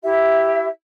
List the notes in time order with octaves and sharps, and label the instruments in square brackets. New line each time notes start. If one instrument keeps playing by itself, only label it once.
[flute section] E4 G4 E5